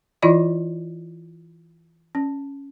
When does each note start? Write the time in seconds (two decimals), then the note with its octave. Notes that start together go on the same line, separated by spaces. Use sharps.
0.22 E3 E4 F4 D5 D#5 B5
2.15 C#4